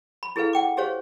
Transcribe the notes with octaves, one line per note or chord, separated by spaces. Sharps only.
B5
E4 G#4 A4 B4 F5
F#5 G5 D6
G4 G#4 C5 C#5 F5